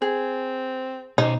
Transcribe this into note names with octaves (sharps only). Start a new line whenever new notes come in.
C4 G#4
B2 D#4 C5